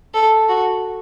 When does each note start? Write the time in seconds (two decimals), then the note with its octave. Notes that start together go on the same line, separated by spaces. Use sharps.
0.14 A4
0.49 F#4